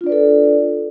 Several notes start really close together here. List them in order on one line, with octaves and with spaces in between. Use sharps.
F4 D4 D5 B4 A4